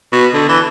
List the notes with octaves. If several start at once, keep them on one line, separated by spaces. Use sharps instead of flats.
B2
D3
E3